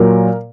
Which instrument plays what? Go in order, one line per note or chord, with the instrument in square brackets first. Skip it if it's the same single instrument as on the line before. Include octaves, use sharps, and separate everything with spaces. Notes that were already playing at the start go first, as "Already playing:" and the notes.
Already playing: [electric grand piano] A#2 F#3 A#4